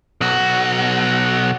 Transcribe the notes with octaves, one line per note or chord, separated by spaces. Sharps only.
B1 F#4